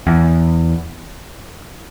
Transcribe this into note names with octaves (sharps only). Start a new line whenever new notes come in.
E2